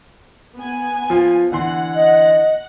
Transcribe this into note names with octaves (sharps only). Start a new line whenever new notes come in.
B3 G#5
F3 F4
D3 E3 F#5 C6
D#5